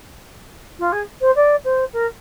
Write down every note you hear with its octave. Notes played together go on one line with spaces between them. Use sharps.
F4
G#4
C5
D5
C5
A#4